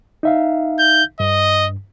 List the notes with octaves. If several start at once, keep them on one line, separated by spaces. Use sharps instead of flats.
D#4 E5 F5
G6
G2 D#5